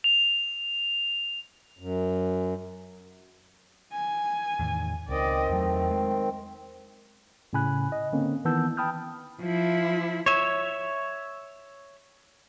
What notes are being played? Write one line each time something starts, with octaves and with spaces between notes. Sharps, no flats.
F7
F#2
G#5
E2 A2 D#3
C#2 D#3 C4 D5 D#5
E2 F#3 A3
G#3
A2 C#3 C#4 G#5 B5 F#6
D#5
D3 A#3 C4 C#4
D#3 E3 B3 A5 E6 G6
G5 A5 B5 D#6 F6 G6
F3 E4
C#5 E5